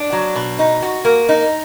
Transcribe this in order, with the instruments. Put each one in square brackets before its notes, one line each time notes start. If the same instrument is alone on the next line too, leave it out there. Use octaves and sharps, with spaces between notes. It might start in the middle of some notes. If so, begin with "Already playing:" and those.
Already playing: [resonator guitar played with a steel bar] D4
F#3
B2
D#4
F#4
A#3
D#4